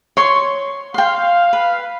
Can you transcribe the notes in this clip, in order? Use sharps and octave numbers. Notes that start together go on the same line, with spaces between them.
C#5 C6 C#6
F5 G5 C6
B4